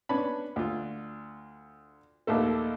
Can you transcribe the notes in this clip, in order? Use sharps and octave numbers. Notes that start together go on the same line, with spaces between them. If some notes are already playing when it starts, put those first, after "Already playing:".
B3 C#4 D4 A5 B5
D2 F4
A#1 D#2 A3 A4